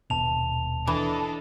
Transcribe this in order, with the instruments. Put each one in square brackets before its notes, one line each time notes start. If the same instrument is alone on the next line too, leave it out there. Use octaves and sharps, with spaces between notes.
[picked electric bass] D#1 B2 [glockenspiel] A5 F7
[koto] E3 [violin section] D4 A4 D#5